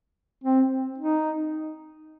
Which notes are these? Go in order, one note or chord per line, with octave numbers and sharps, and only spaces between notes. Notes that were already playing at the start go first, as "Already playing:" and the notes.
C4
D#4